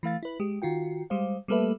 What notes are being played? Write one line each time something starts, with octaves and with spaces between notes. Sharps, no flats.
E3 A3 F5 A6
E4 B4
G#3 G4
D#3 F4 F#4 G5
G3 G#3 C5 F5
G3 A3 A#3 A4 B4 E5